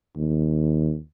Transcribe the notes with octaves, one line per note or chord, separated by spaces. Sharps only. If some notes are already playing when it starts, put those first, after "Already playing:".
D#2